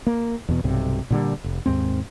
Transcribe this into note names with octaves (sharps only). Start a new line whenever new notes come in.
A#3
E2 B2
B1 G2 C3
A#2 D3 G3
F1
D#2 G#2 C4